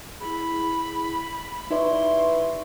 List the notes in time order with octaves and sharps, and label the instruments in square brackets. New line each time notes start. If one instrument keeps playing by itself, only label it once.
[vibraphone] E4 G#4 [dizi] B5
[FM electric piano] D#4 B4 D5 [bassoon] E4 [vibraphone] G4 E5 C#6 [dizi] C6